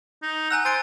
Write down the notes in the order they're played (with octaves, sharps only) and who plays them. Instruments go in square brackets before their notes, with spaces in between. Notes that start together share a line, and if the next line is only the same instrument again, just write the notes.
[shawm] D#4
[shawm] F#5 [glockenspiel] G#5 A#5 E6
[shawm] C5 [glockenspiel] G#5 A6 D7